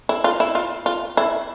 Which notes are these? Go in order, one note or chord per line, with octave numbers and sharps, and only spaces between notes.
E4
F4
E4
F4
F4
E4